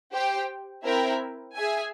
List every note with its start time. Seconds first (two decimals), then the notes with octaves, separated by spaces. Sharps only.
0.13 G4 C5 G5
0.83 C4 E4 A#4 E5 G5
1.55 G#4 E5 G#5